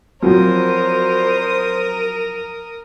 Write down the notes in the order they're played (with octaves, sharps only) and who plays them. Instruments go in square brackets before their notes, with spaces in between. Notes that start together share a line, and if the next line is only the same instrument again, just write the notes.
[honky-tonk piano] F3 F#3 [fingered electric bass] C4 [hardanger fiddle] A#4 D#6 [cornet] C5